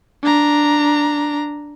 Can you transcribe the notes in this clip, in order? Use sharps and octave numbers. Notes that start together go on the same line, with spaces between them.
D4 A#5